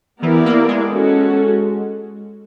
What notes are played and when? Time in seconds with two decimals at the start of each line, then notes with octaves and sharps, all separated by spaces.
0.22 E3 B3 E4 G4 A#4 D5
0.46 A#3
0.68 G#3
0.92 C#4 F#4 A4